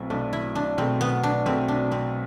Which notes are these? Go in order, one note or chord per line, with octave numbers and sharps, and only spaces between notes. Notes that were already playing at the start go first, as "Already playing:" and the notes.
Already playing: B1 B2 A3 C4 E4
B1 B2 A3 D4
E4
D4
B1 B2 A3 C4
B3
D4
B1 B2 A3 C4
D4
C4